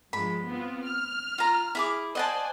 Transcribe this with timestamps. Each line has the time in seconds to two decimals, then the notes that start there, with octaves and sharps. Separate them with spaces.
0.13 G2 F3 G#3 B5
0.47 B3 C4 F4
0.83 F6
1.38 F4 A#5
1.75 E4 G#4 D6
2.15 C5 D5 D#5 F#5 G#5 A5